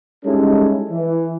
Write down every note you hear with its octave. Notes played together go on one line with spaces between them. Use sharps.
G3 G#3 C#4 D#4 E4 A4
E3